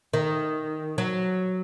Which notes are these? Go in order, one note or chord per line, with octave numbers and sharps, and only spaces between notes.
D#3
F#3